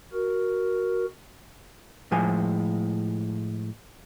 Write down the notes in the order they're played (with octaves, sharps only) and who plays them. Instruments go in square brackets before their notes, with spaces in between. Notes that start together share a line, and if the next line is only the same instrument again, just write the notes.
[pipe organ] F#4 A#4
[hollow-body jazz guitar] A2 F3 G#3 C5 G#5